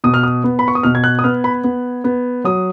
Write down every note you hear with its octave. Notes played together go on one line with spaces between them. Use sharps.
B2 D#6
F6
D#6
B3
B5
C#6
D#6
B2 F6
G#6
F#6
D#6
B3 F6
B5
B3
B3
F#3 D#6